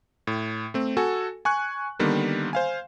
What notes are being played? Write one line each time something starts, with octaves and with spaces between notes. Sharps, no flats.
A2
A3 C4
F#4 A4 G#5
G#5 C#6 F#6
D3 D#3 G3 A#3 B3
C5 F5 G#5